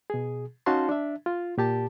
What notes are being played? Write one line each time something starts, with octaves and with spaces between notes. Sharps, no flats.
B2 G#4
C#4 D#4 F#4 F5 A5 C6
D4 E5
F4
A#2 G4 A5